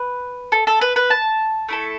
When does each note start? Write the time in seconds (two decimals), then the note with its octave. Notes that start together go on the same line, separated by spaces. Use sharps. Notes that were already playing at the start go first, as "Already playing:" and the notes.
Already playing: B4
0.52 A4
0.67 A4
0.81 B4
0.96 B4
1.10 A5
1.69 A3 E4 A4